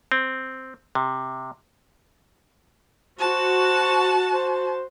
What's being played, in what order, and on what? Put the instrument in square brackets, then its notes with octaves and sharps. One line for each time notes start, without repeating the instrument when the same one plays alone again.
[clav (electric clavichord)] C4
C3
[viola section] F#4 [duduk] C5 [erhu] A5
[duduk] C5